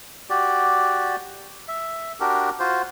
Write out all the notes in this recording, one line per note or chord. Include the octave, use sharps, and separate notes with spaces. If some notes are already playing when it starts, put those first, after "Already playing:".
F#4 G4 D5
E5
D4 F#4 G4 A#4
F4 F#4 C5